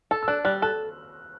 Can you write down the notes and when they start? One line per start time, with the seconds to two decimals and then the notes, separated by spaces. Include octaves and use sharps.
0.11 A4 E6
0.23 E6
0.28 D4 F#6
0.45 G3 F#6
0.62 A4 F#6